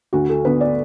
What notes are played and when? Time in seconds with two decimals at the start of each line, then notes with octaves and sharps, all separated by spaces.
0.13 D2 F#4
0.29 A4
0.45 D3 B3 B4
0.61 D5